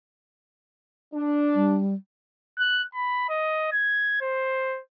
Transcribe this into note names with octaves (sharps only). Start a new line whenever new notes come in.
D4
G3
F#6
B5
D#5
G#6
C5